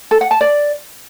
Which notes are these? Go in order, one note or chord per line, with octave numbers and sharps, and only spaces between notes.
A4
F#5
A5
D5